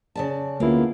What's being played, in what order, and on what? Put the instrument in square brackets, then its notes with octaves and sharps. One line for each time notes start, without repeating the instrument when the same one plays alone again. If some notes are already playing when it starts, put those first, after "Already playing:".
[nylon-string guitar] C#3 D5 A5
[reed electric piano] D2 E4 [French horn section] C#3 B3 F4 [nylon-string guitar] A#3 D4